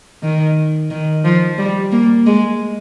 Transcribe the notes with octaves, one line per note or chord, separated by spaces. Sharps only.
D#3
D#3
F3
G3
A#3
G#3